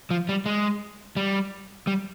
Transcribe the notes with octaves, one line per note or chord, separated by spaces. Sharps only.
F3
G3
G#3
G3
G3